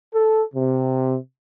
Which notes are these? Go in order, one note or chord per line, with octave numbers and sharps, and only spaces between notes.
A4
C3